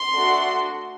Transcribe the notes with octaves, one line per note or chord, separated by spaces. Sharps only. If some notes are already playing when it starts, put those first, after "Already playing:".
Already playing: C6
A3 D4 F#4 A4